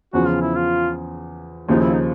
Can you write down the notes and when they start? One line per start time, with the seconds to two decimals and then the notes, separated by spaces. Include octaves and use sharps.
0.13 E2 C#3 F3 F#4
0.28 F4
0.41 E4
0.55 F4
1.68 D#2 C#3 F3 D#4
1.81 E4
1.93 D#4